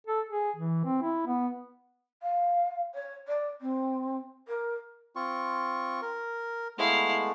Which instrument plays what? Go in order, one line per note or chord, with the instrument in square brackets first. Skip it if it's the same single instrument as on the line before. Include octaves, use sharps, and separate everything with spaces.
[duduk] A4
G#4
E3
C4
E4
B3
[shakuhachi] F5
C#5
D5
C4
A#4
[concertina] C4 F4 C#6
A#4
[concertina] G#3 A3 B3 [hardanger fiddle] E4 F5